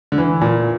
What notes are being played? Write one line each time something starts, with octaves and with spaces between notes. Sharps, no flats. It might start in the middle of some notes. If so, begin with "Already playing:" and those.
D3
E3
A#2